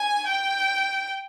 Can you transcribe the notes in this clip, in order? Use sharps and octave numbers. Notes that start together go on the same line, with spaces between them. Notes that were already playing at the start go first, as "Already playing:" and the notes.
Already playing: G#5
G5